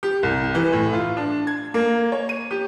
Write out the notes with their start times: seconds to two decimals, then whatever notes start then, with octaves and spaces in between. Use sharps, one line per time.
0.03 G4
0.23 C2
0.55 E3
0.73 A2
0.93 F4
1.17 D4
1.47 G#6
1.74 A#3
2.12 C#5
2.29 D#7
2.51 G4